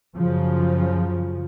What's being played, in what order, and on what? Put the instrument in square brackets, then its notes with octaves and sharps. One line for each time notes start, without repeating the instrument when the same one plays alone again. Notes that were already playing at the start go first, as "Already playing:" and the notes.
[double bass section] F#2 C#3 F3